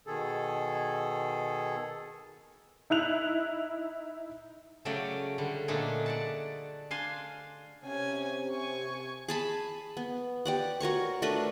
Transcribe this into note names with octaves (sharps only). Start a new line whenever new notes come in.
B2 D#3 G#4 A4
D#4 E4 F#6 F7
C#3 F#3 A3 C#5 D5 G5
D3 G3
A#2 D3 A3 D4 D#4 G#4
D5 F#5 A5
D4 F5 G#5 C6
C3 C#4 G#5
G#5 C#6
G#4 A5 B5
B3
G4 D5 F#5
F#4 A#4 C#5 C#6
A3 D4 A#4 B4